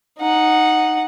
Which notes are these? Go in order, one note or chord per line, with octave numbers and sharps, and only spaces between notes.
D#4 F#5